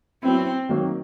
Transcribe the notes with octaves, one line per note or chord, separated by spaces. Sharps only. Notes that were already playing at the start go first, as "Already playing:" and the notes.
F#3 B3 C4 E4
D#3 F#3 A#3